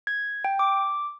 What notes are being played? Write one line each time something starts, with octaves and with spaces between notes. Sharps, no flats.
G#6
G5
D6